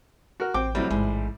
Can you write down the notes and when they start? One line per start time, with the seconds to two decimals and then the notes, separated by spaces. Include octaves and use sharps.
0.40 F#4 A#4
0.54 A1 C4 G5 D6
0.75 A2 C3 F#3 G3 C4
0.91 A1 G#2